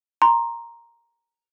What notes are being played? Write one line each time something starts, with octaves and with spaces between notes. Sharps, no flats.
A#5 C6